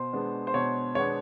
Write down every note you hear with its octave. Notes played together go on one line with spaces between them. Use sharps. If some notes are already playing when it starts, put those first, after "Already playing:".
Already playing: B2 C5
G#3 B3 D4
C5
B2 C#5
G#3 B3 D4 C#5